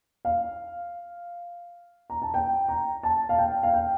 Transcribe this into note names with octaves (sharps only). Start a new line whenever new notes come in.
F5
A#5
A5
G5
A#5
A5
F5
G5
F5
G5